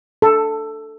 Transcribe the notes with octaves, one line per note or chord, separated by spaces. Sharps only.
A4